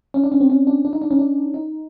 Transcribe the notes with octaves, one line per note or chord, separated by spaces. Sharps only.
C#4
D4
C#4
C4
C#4
D4
D4
D#4
D4
C#4
D4
D#4